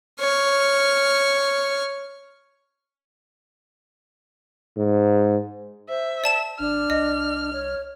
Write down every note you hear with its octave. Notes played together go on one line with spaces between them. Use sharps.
C#5 F6
G#2
C5 E5
D5 A5 E7
G#1 D4 F6
C2 D#5
C#5